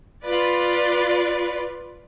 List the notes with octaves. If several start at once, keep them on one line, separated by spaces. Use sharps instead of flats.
F4 B4 D5